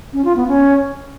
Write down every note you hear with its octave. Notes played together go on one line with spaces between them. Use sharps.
C#4
F4
B3
C#4